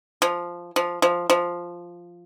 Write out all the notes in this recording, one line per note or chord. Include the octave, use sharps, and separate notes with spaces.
F3
F3
F3
F3